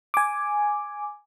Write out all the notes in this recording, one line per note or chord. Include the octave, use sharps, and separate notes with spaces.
G#5 D6